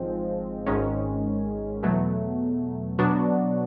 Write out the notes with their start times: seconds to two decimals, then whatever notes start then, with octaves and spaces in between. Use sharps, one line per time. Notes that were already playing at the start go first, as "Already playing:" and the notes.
Already playing: G#1 G#2 F3 G#3 C4
0.66 G#1 G#2 D#3 G#3 C#4
1.83 E2 B2 F#3 A3
2.99 B2 F#3 B3 D4 F#4